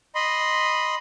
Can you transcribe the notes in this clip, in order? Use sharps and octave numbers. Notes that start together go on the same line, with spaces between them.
D#5 B5 C6